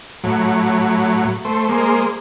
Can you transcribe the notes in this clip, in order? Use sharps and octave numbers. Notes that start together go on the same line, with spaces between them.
A2 F#3
A3 C5
G#3 A#3 C5